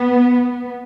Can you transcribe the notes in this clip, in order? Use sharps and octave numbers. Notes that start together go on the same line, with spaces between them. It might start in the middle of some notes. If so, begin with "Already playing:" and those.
Already playing: B3